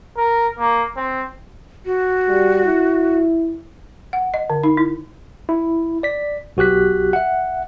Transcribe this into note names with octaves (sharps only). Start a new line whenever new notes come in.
A#4
A#3
C4
F#4
G3
E4
F#5
D#5
D3
D#4
E4
E4
D5 B6
B1 F#4 G4 F#6 B6
E5 F#5